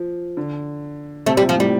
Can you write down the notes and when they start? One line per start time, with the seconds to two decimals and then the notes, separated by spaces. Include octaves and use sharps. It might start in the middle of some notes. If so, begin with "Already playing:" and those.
Already playing: F3
0.37 D3
1.26 C3 A3
1.37 G3
1.42 A#2
1.49 F3
1.56 A2 G3